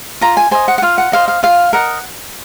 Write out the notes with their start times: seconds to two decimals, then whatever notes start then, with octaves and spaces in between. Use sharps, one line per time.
0.21 F4 A#5
0.37 G#5
0.51 C5 D#5 G#5
0.68 F#5
0.78 F#5
0.82 F4 F5
0.98 F#5
1.12 C5 D#5 F5
1.28 F5
1.43 F4 F5
1.73 A#4 D#5 F#5